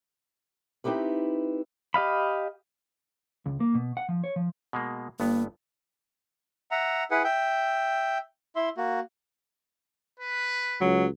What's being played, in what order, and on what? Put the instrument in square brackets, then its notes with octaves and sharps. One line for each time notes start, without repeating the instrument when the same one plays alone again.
[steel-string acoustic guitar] C4 D#4 E4 G4 B4
[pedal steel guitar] G4 D#5 F5 B5
[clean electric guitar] C#2
A#3
B2
F#5
F3
C#5
F3
[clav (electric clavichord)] B2 G#3 A#3
[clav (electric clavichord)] G1 G2 B3 [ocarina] A#3
[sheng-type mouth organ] E5 F#5 A#5
E4 G#4 B4 F#5
E5 G5
E4 E5 C6
A#3 F#4
[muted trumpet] B4
[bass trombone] C#2 [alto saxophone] F#3